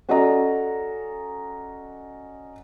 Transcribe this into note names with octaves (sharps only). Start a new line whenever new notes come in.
C#4 F#4 A4 D5 D#5 A#5